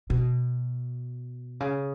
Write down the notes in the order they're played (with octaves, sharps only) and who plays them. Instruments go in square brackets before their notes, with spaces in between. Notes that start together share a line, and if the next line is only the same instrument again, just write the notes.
[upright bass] B2
C#3